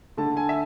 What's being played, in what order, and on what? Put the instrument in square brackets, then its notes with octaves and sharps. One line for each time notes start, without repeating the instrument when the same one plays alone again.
[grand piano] D3 A3 A5
G#5
E5